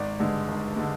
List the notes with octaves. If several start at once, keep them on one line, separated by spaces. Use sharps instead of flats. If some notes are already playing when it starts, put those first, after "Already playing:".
Already playing: G#1 D5
G2 D3 G#3
G#1
D3 G#3